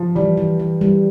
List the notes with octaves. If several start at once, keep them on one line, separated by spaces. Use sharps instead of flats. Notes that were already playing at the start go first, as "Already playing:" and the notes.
Already playing: F3
E3 G3
E3
E3
G3